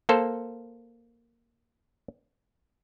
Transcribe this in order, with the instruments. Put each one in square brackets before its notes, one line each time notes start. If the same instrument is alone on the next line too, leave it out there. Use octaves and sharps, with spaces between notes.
[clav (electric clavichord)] A#3 A4 C5